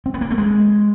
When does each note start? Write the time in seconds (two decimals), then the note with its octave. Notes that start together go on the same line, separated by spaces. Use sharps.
0.06 C4
0.14 B3
0.21 A#3
0.31 A3
0.38 G#3